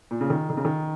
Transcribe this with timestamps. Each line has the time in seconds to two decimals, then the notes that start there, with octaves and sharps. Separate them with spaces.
0.11 A#2
0.21 C#3
0.30 D#3
0.50 D#3
0.57 C#3
0.65 D#3